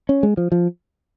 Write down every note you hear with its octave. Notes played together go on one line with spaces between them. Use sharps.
C#4
G#3
F3
F3